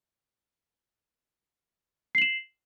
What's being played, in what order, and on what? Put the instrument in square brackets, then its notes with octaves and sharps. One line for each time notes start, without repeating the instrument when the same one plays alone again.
[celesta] C7
F#7
E7